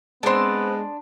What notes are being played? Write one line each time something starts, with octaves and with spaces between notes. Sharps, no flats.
G#3 B3 C4 D4 A5 C6